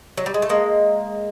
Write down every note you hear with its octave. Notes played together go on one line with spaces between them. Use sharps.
F#3
G3
G#3
A3
G#3 A#3